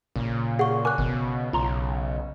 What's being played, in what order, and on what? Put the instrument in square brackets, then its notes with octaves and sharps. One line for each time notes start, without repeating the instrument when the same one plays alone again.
[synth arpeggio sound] A1 [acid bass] A#2 [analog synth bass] C#3
[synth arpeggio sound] G#4 [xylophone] F#5 C#6
[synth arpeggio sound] A#4 G#5 [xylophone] D6 F#6
[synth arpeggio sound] G#1 [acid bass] B2
[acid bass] B1 [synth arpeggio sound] F4 A#5 C6